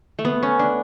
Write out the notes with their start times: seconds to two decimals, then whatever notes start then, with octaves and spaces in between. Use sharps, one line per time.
0.19 A3
0.25 B3
0.43 C#4
0.59 D4